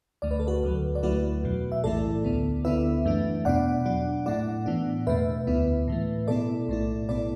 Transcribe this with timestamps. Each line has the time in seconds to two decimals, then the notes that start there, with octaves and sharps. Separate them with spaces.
0.22 D2 D3 A3 D5
0.31 B4
0.40 A4
0.47 F#4 B4
0.63 D2 D3 F#3
0.95 D5
1.03 D2 D3 F#3 A3 E4 F#4 B4
1.44 E2 B2 F#3
1.72 E5
1.84 B1 A2 E3 A3 E4 A4 D5
2.24 D2 D3 B3
2.65 D2 D3 B3 E4 B4 E5
3.05 F#2 E3 A3 D4
3.45 E2 B2 B3 D4 D5 F#5
3.86 B2 F#3 D4
4.26 A2 A3 E4 D5 F#5
4.66 A2 E3 B3 D4
5.07 E2 B2 A3 B4 E5
5.47 D2 D3 B3 E4
5.88 A2 E3 A3
6.28 B2 B3 E4 A4 D5
6.68 B1 A2 A3 E4
7.09 B2 B3 E4 A4 D5